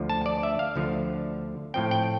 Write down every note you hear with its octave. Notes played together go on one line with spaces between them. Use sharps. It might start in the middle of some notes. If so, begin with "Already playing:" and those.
Already playing: D2 D3 F3
A5
D5
E5
F5
D2 D3 F3
A2 F3 C4 G5
G5